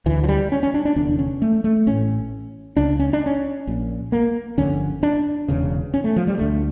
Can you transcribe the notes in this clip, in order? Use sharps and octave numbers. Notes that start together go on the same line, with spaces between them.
D2 D3 E3
F3
G3
C#4
C#4
D4
D4
F1 E2 D3 D4
C#4
A3
A3
A1 A2 C#4
C#2 C#3 D4
C#4
D4
C#4
A#1 A#2
A#3
G1 F2 D3 C#4
D4
E1 E2 C#3
C#4
A3
F3
G3
D2 D3 A3